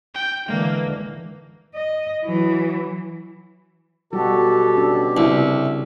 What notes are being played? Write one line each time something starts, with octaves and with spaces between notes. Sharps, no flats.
G5
D3 E3 G#3 A#3
D#5
E3 F#3
B2 G3 F#4 G4 A4
C#4 D4
C2 C#3 G3 E5